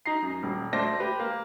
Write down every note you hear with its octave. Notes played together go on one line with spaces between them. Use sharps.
D#4 A#5 C7
F#2
D#1
D2 C5 D5 A5 A#6
G4 B4
A#3